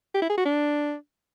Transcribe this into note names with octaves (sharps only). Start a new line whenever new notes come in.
G4
E4
G#4
F#4
D4